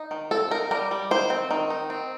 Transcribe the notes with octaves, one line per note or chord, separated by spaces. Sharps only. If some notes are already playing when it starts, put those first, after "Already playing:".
Already playing: D#4
D#3
C4 A4
D#4 A#4
G3 A#4
G3
D#3 C5
C4
D#3
D#4
C4